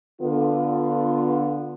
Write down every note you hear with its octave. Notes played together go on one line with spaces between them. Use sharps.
D3 B3 F4